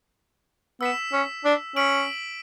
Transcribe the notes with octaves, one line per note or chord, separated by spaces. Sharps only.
B3 E6 B6 E7
C#4
D4
C#4 E6 B6 D7 F#7